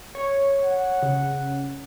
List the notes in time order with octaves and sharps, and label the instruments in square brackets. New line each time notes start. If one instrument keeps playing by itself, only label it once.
[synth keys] C#5
[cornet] F#5
[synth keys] C#3